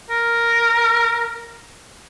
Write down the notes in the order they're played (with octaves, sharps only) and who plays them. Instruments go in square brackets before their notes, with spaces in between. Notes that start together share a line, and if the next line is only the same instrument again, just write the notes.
[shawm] A#4